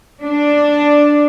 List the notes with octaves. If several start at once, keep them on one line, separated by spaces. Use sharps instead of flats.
D4